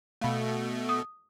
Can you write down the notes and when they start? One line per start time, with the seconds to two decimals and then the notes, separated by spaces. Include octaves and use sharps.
0.21 B2 A3 F5 B5
0.89 D#6